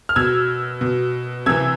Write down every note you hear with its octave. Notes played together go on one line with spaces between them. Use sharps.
F6
B2 E6 G#6
B2
C3 E3 E6 G#6